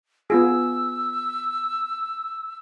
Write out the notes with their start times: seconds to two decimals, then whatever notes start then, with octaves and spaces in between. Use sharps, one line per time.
0.30 B3 F4 G#4 E6